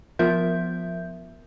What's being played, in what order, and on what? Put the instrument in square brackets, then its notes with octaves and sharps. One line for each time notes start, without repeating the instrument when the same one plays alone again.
[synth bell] F3 B3 F4 A#4 E5 G6